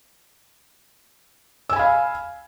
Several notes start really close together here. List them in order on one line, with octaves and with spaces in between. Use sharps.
E6 G#5 B5 F5